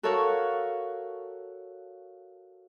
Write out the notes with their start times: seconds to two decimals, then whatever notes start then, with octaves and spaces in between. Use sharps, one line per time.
0.03 F#4 A4 A#4 C#5 F5 F#5